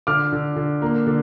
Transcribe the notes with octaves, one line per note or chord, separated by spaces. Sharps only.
D3 D6 F6
D3
D3
A#3
D3